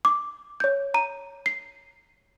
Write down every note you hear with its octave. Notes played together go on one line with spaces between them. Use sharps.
D6
C#5 G6
A#5 D#7
C7